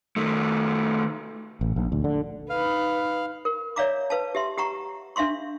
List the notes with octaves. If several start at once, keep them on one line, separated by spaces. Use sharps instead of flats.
D#3 A3
A1
A#1
D2
D3
D#4 B4 F5
A#4
C#5 D5 E5 F5 A#5 D6
B4 F5 A5
G4 E5 C6
G4 F#5 A#5 C#6
D4 E5 F5 C6 C#6